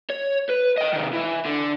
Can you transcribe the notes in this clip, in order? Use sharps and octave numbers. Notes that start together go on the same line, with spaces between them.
C#5
B4
D#5 G5
C3 D#3
E3
D3